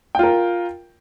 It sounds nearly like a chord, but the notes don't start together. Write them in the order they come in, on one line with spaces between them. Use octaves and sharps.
G5 F4 A#4